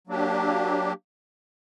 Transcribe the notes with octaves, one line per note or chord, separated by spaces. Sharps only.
F#3 A#3 D4 G4